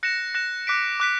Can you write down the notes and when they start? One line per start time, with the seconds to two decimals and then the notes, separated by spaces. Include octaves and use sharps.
0.03 F#6 A#6 C#7 E7
0.34 F#6 A#6 C#7 E7
0.67 D6 F#6 B6 D7
1.00 D6 F#6 B6 D7